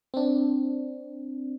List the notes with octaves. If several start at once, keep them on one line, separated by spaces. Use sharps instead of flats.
C4 D4